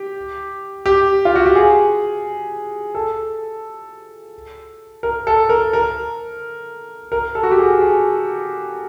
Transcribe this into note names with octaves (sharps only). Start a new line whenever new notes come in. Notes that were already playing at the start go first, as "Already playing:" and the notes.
Already playing: G4
G4
F4
F#4
G4
G#4
A4
A#4
A4
A#4
A#4
A#4
A4
F#4
G4
G#4
G#4